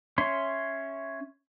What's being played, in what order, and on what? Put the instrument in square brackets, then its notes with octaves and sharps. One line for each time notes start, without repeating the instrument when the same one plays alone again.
[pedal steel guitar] C#4 C#5 E5 C6